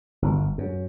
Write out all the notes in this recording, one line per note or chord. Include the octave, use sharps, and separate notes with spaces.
G1
F#2